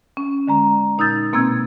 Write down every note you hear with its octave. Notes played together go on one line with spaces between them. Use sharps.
C#4
D3 G#3 A#5
A#2 D#4 D#6 E6 G6 A6
B2 A#3 C4 E6 G#6